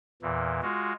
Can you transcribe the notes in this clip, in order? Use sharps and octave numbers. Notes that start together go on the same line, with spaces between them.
E2 A#2 E3
G#3 F4 F#4